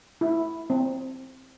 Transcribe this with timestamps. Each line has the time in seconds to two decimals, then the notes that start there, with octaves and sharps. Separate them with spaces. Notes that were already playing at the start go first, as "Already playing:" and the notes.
0.21 E4
0.70 C4